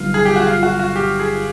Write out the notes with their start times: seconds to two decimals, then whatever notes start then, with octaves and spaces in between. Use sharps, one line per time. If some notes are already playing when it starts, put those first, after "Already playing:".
Already playing: G1 G2 D#3 F#3 F4
0.14 G#4
0.25 G4
0.36 F#4
0.47 F4
0.63 F#4
0.79 F#4
0.96 G4
1.19 G#4